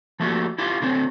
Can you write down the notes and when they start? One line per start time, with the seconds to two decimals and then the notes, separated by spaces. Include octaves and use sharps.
0.20 F3 A3 A#3 D#4 F#4 G4
0.58 E4 F4 G4
0.82 D3 F#3 C4